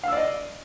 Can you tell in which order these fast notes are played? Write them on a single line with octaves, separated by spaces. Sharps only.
F5 E6 D5 D#5